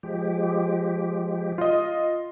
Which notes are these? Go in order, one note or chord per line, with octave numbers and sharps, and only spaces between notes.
F3 G#3 G4
F4 D#5